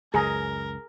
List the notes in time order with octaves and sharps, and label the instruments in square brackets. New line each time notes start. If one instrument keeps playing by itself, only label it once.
[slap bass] C#2 F#2 [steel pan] G#4 A#5 [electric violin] A#4